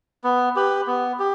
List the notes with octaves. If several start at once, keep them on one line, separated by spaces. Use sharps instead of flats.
B3
G4 B4
B3
G4